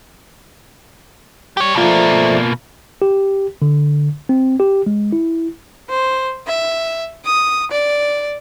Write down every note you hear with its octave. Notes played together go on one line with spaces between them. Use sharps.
G3 G4 C#5
B2 F3 A3 A#3 F4 D5 A#5 D6
G4
D3
C4
G4
G#3
E4
C5
E5
D#6
D5